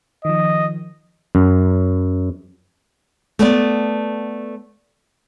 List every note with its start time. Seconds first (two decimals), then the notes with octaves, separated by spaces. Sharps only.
0.25 D#3 F3 D#5
1.35 F#2
3.39 A3 B3 D5